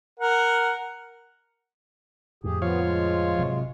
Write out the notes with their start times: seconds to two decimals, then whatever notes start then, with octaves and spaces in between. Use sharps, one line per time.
0.19 A#4 F#5
2.44 F2 A2 D3 G4 G#4
2.62 F3 B3 F4 C#5 F5
2.81 G#3 F4
3.38 G#1 C3 F#3